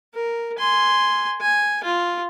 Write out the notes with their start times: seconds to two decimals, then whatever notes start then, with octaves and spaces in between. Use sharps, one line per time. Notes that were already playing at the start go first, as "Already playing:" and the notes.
0.15 A#4
0.59 G#5 C6
1.41 G#5
1.83 F4